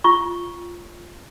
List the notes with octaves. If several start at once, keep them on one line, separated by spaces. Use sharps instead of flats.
F4 C#6